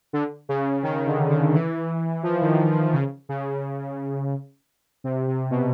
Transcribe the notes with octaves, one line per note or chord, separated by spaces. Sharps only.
D3
C#3
D#3
D3
D#3
E3
F3
D#3
E3
D#3
C#3
C#3
C3
C3
B2